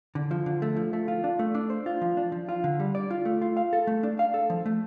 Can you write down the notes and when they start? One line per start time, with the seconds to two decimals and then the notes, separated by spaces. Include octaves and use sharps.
0.15 D3
0.31 F3
0.46 D3
0.62 A3
0.76 F3
0.93 A3
1.08 F4
1.24 D4
1.39 A3
1.55 D4
1.70 C5
1.86 F4
2.02 F3
2.17 D4
2.32 F3
2.49 F4
2.64 D3
2.80 G3
2.95 D5
3.11 F4
3.25 A3
3.42 F4
3.57 F5
3.73 A4
3.87 A3
4.03 D4
4.19 F5
4.34 A4
4.50 F3
4.66 A3